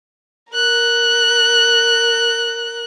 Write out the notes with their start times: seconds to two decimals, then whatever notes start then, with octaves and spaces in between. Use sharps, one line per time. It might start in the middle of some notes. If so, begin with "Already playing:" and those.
0.52 A#4 F#6